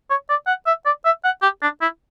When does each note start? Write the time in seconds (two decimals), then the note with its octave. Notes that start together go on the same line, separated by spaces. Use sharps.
0.10 C#5
0.29 D5
0.47 F#5
0.67 E5
0.86 D5
1.05 E5
1.24 F#5
1.42 G4
1.62 D4
1.81 E4